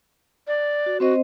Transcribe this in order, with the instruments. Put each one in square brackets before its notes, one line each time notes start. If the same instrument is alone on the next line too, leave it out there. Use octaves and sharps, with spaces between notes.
[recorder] D5
[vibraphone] F#4
[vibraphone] C4 C5 D#5 [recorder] F#4